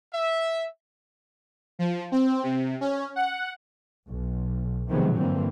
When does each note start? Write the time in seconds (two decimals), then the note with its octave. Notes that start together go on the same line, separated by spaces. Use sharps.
0.14 E5
1.79 F3
2.12 C4
2.43 C3
2.81 C#4
3.16 F#5
4.09 B1
4.89 C3 D#3 F3 F#3 G#3 B3
5.18 G2 D3 E3 A#3 C4